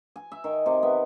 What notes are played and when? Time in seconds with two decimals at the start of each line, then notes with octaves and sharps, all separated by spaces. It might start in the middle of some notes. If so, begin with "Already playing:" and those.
0.16 G#5
0.32 E5
0.44 D#3
0.66 C3
0.83 B3